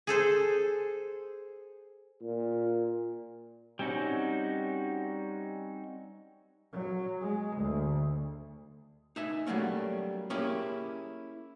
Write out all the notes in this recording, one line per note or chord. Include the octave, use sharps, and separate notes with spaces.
G#4 A4 C5
A#2
G3 C4 C#4 D#4 F#4
F#3
G#3
D2
D#4 E5 G#5
F#3 G3 A3 A#3 C#4
A#3 C#4 E4 G4 G#4